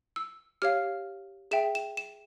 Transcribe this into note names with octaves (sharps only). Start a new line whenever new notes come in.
E6
G4 C#5 F5 F6
G#4 E5 G5 E7
E7
E7